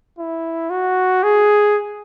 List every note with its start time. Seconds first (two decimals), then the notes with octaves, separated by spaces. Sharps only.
0.18 E4
0.70 F#4
1.24 G#4